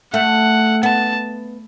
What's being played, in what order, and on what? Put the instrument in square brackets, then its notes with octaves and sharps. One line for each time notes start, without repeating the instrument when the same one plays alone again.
[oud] A3 [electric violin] F#5
[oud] B3 [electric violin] A5